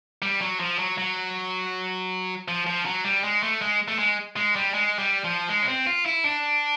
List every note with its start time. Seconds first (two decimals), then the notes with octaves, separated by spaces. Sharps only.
0.22 G3
0.41 F#3
0.60 F3
0.79 F#3
0.98 F#3
2.48 F3
2.67 F3
2.85 F#3
3.04 G3
3.24 G#3
3.43 A3
3.61 G#3
3.88 A3
3.99 G#3
4.36 G#3
4.56 G3
4.74 G#3
4.99 G3
5.24 F3
5.49 G#3
5.63 C#4
5.68 C4
5.87 F4
6.06 E4
6.24 D4